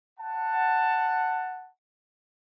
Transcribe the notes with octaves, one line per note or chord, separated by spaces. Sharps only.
F#5 A5